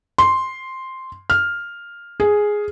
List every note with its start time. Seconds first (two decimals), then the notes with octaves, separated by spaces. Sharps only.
0.18 C6
1.30 F6
2.20 G#4